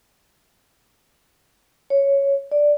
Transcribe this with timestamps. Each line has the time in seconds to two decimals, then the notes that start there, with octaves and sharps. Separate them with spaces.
1.90 C#5
2.51 D5